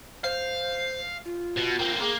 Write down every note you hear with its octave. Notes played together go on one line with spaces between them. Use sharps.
C5 F5
F4
B2
A#3 C4
A#3 G#4